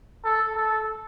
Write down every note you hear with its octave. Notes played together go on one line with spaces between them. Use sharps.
A4
A4